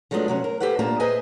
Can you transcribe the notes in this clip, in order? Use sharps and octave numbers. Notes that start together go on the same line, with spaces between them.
F3 F#3 G#3 A3 B3 D4
C3 F#3 C#4
A#4
G4 A4 B4 C5 F#5
A#2 G3 A#3 D4 A5 A#5
G#4 B4 C5 D#5 E5 G#5